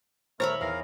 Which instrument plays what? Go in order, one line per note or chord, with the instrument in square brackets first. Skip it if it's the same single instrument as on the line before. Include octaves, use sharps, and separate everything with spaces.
[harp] D#1 E6 [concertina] A3 A#4 [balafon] C5 [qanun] C#5 A#5 B5
[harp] E2 F6 A#6 [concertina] A#4 F5